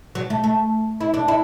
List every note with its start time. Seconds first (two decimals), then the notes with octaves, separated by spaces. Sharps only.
0.15 F#3
0.30 A3
0.44 A3
1.00 E4
1.14 D4
1.28 E4